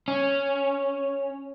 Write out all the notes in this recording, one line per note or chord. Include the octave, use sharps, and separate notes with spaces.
C#4